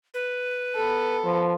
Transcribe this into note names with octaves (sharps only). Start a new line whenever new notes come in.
B4
B3 A4
F3